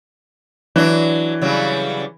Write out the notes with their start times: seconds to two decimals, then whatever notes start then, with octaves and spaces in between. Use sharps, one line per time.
0.76 E3 F#3 D4
1.42 C#3 F#3 G3